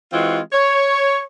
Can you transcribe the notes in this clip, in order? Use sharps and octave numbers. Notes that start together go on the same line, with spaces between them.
E3 G#3 C4 F4 F#4
C#5